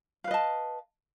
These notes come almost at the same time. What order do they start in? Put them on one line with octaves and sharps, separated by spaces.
F5 B4 D#5 A5